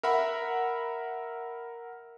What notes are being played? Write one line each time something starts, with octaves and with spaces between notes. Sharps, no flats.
A#4 E5 F#5 B5